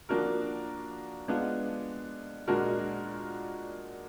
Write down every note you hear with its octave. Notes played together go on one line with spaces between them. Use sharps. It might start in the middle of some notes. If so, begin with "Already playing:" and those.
F3 A#3 D4 F#4 A#4
G#3 B3 D4 F4
A#2 G#3 D4 F#4 A#4